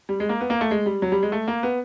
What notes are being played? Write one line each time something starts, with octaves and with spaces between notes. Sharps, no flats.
G3
G#3
A#3
B3
A#3
A3
G#3
G3
F#3
G3
G#3
A3
A#3
B3